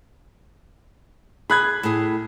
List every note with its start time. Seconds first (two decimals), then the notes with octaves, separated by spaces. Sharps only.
1.50 G#4 B5 F#6 G#6
1.83 A2 G#4